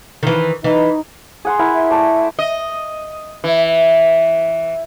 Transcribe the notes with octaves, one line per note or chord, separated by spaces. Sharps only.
D#3 E3
E3 D#4
G#4 F#5 C6
E4 A#4 F#5
E5
A3 A4 D5
D#5
E3